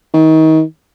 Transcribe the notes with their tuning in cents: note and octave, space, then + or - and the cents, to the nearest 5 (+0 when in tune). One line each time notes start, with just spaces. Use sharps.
D#3 +30